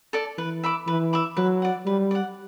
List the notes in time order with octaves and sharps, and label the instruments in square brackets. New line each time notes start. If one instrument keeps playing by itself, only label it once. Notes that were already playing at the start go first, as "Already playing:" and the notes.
[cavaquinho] A4 D5 A5
[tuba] E3 [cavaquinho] B4
[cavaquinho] E5 B5 D6
[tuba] E3 [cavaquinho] B4
[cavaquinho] E5 B5 D6
[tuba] F#3 [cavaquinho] B4
[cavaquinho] D5 F#5
[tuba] G3 [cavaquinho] B4
[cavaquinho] D5 F#5